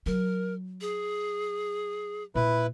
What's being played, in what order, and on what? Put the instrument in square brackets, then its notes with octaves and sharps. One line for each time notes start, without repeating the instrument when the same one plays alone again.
[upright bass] F#3 [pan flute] A#4
[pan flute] G#4
[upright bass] A#2 [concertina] E4 B4